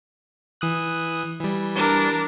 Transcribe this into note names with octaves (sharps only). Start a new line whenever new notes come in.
E3 D#6 F#6
E3 G3
D4 A#4